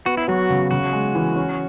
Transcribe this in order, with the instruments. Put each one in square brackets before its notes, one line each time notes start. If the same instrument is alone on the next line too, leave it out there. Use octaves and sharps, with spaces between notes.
[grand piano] B3 [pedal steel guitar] F#4
[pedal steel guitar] E4
[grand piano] F#3 [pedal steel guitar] F#4
[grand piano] C#3
[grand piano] C#3 [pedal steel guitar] F#4
[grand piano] G#3
E3
C#4